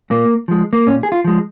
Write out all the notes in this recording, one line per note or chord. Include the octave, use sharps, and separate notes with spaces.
A#2 A#3
F3 G#3
A#3
A#2 C#4
G#4
F4
F3 G#3